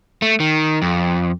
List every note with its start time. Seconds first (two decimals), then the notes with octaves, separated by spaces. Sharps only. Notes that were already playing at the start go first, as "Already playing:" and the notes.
0.22 A3
0.40 D#3
0.82 F2